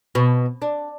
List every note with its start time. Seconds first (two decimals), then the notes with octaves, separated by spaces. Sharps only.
0.15 B2
0.62 D4